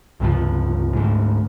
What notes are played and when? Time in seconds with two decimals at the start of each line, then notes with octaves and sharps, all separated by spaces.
0.20 C#2 G2 C3 F3
0.93 D2 G#2